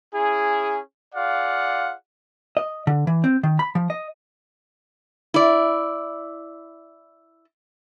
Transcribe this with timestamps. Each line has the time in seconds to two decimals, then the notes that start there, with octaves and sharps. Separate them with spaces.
0.13 C#4 E4 G#4
1.14 F4 G#4 D5 F5 F#5
2.57 D#5
2.87 D3
3.07 E3
3.24 C4
3.43 D#3
3.59 B5
3.75 F3
3.90 D#5
5.34 E4 D5